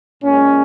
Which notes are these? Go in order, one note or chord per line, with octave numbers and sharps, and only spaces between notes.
A#2 G#3 C#4